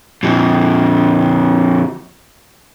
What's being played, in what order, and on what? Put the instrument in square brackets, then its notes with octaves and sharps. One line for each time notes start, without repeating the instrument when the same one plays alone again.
[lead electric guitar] F2 A#2